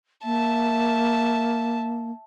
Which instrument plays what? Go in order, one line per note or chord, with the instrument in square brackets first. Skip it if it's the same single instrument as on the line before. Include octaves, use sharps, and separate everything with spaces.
[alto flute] A#3 [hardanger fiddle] E5 A5